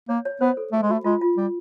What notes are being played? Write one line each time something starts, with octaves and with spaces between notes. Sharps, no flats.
A#3 C#5
C#5
B3 C5
A4
A3 G#4
G#3
A3 F#4
G#3 F4
F4
G3